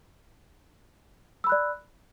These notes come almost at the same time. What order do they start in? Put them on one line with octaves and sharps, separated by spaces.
E6 B5 F#6 D5